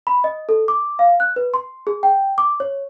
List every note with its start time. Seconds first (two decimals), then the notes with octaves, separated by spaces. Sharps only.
0.07 B5
0.24 D#5
0.49 A4
0.68 D6
0.99 F5
1.20 F#6
1.36 B4
1.54 C6
1.87 G#4
2.03 G5
2.38 D6
2.60 C#5